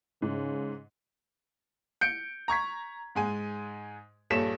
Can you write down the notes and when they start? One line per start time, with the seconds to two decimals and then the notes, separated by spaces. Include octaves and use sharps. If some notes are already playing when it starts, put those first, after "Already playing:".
0.22 G#2 C#3
2.01 G6 C#7 D7
2.48 A#5 C#6 G#6 B6
3.15 G#2 G#3 G#5
4.30 A#1 G2 A4 C#5 B6 E7